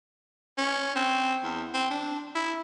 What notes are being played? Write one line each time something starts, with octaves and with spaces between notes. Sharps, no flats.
C#4
C4
E2
C4
D4
E4